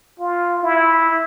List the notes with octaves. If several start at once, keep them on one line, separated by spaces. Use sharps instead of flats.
F4
E4